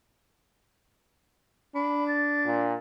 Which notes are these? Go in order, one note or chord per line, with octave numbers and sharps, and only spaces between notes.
D4 B5
A6
A#2